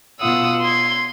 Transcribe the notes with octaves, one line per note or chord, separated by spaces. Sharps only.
B2 F4 F#5 D#6 E6
C6 G#6